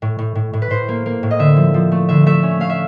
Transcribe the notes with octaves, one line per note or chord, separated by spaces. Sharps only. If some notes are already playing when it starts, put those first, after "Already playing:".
A2
A2
A2
A2
B4
A2 C5
A#3
A#3
A2
D#5
D3 E5
F3
F3
A3
D3 E5
A3 E5
C#4
A3 F5
E5